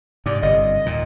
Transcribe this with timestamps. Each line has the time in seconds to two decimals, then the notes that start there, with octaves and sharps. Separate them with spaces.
0.26 G#2 C3 D5
0.42 G1 C3 D#5
0.86 D#2 A#2